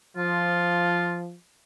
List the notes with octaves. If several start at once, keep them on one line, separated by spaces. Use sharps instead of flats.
F3 F4